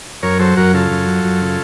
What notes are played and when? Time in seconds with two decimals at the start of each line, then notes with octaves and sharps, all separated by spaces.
0.23 F#2 A#4 C#5
0.39 F#3 A4 C5
0.57 F#2 F#4 A#4
0.73 C#3 F4 A4
0.91 F#2
1.07 F#3
1.24 F#2
1.41 C#3